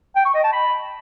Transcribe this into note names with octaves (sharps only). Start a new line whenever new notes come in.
G5
C#6
D#5
A5
B5